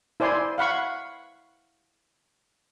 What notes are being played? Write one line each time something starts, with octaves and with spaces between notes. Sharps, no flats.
E4 C5 D5 G#5 C6
F5 F#5 B5 C#6